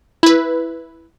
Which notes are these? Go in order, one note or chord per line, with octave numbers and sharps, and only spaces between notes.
E4 B4